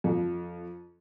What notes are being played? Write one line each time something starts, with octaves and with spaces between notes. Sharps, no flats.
F2